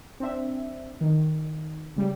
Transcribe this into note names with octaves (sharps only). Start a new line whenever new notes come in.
C4 D4 E5
D#3
C#3 G3